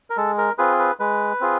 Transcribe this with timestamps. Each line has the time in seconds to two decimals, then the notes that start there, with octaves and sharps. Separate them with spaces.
0.10 A#4
0.17 G#3 A4
0.38 A#4
0.58 C4 F4 G#4 B4
0.79 B4
1.00 G#3 B4
1.41 C4 F4 G#4